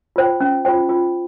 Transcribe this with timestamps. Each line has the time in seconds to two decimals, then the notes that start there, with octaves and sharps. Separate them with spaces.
0.16 F4 C5 G5
0.41 C#4
0.65 F4 C5 G5
0.89 F4